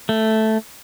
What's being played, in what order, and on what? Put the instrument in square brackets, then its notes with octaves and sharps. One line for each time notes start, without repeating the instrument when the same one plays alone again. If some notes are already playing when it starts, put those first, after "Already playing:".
[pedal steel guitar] A3